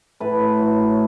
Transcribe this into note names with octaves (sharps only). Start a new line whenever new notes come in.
A2 B4
A2
F#3
A2